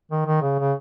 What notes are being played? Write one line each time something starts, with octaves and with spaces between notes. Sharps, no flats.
D#3
D#3
C#3
C#3